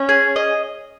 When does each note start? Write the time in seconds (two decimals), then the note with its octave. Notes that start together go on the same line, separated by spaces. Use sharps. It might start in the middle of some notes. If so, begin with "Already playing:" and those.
Already playing: C#4
0.09 G#4
0.36 D#5